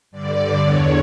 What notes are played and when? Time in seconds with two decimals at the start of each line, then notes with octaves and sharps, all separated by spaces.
0.11 G2 D3 D5
0.60 E2 D3 C#5